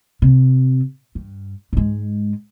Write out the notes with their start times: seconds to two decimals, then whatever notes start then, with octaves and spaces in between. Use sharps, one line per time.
0.22 C3
1.15 G2
1.73 G#2 G#3